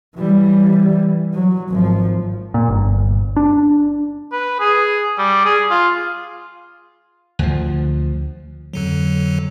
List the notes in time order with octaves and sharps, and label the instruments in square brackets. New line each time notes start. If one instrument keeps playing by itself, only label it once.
[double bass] E3 G3
F#3
G#1 F3
[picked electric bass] A#2
G1
D4
[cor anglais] B4
G#4
G3
G#4
F4
[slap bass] D2 F3
[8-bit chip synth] F2 D3 F#3